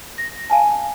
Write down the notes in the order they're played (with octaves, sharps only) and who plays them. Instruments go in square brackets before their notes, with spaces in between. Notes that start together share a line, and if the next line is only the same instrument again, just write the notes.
[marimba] A#6
F5 G#5 A5